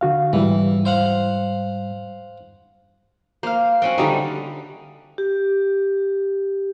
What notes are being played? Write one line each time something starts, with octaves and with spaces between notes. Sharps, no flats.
D3 F#4 F5
G#2 E3 G3
C5 F5 F#5
A#3 C5 F5
C4 C#4 F#4
D3 G3 D#4 E5
G4